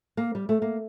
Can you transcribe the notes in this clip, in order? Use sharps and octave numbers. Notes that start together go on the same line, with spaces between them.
A#3
G3
A3
A#3